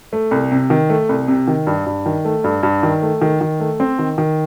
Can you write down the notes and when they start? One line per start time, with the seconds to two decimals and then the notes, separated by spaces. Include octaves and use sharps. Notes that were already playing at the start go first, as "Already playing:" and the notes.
0.13 A3
0.31 C2
0.52 C3
0.70 D#3
0.90 A3
1.09 C2
1.28 C3
1.48 D#3
1.67 G2
1.86 G2
2.06 D#3
2.25 A3
2.44 G2
2.63 G2
2.83 D#3
3.02 A3
3.21 D#3
3.41 D#3
3.60 A3
3.80 C4
3.99 D#3
4.18 D#3